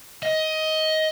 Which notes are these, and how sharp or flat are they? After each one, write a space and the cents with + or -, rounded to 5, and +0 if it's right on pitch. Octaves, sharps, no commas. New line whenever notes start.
D#5 +15